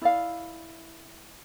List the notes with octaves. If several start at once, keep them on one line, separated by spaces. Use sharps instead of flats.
E4 D5 F5